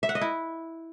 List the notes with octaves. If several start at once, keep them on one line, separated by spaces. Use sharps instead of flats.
E5
F#5
D#5
E4